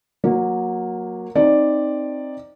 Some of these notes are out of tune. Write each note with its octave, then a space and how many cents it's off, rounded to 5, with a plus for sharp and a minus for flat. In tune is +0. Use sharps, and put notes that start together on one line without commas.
F#3 -20 A#3 +0
C4 +15 D#4 +0 D5 +0